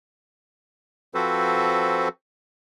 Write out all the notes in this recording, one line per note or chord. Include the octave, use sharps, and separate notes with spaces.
F3 C4 F#4 A4 B4 C5